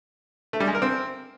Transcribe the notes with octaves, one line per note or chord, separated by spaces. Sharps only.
A3
G3
G#3
A#4
C4